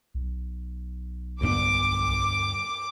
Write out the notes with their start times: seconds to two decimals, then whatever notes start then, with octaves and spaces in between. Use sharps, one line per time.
0.14 B1
1.41 D2 G2 B3 D6